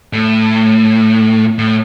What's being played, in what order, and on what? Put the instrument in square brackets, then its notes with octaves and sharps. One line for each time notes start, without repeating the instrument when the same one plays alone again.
[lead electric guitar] A2
A2